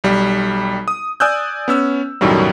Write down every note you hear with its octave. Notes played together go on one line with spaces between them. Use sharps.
B1 G3
D#6
D5 G#5 D#6 E6 F#6 G6
B3 C#4 E6
B1 F#2 A2 D#3 F#3 G3